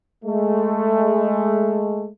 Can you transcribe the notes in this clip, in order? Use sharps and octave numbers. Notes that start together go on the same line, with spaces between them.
G#3 A3